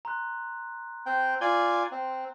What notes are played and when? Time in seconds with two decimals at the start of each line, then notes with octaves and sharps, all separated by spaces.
0.05 A#5 C6 F#6
1.06 C4 G5
1.41 F4 D5 G#5 G7
1.91 C4